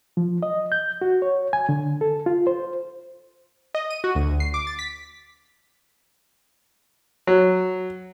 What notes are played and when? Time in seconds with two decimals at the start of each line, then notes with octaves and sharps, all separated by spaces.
0.17 F3
0.43 D#5
0.72 G6
1.01 F#4
1.22 C#5
1.53 G#5
1.69 D3
2.01 A4
2.26 F4
2.47 C5
3.75 D#5
3.91 D#7
4.04 F#4
4.15 D2
4.40 C7
4.54 D6
4.67 A6
4.79 B6
7.27 F#3